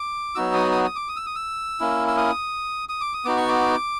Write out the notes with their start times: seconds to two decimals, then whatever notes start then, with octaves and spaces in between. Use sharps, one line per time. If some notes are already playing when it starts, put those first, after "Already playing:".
Already playing: D6
0.35 F#3 B3 D#4 F#4 E6
0.54 D#6
0.71 D#6
0.84 D#6
0.96 D6
1.08 D#6
1.16 E6
1.26 D#6
1.35 E6
1.80 A#3 C#4 E4
2.07 E6
2.17 D#6
2.89 D#6
3.01 D6
3.13 D#6
3.25 B3 D#4 F#4 D6
3.37 C#6
3.48 D6